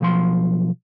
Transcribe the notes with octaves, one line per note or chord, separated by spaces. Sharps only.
B1 F3 C6